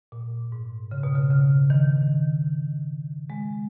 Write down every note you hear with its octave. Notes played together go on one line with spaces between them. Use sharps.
A#2
G#2
C#3
B2
C#3
C#3
D#3
G#3